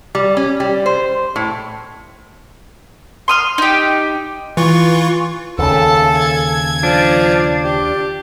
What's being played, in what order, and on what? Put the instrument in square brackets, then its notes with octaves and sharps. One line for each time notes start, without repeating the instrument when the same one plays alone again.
[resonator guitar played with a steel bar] G3
C#4
G3
C5
A2
[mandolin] C6 D#6 F6
D#4 G4
[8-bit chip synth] E3 F4 C#6
[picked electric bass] D#2 C#3 [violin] A3 A5 [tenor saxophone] A4
[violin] G#6
[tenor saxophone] F3 [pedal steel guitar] D4
[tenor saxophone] G4